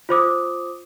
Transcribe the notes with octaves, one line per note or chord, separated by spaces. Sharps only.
F4 C5 D6 D#6